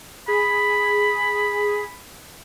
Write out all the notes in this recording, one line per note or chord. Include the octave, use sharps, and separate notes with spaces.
G#4 B5